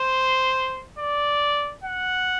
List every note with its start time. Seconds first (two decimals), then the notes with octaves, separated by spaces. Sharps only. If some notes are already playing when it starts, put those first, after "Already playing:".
Already playing: C5
0.99 D5
1.84 F#5